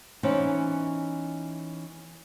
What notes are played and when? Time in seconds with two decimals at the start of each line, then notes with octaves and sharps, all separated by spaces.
0.23 E3 B3 C#4 D#4 C5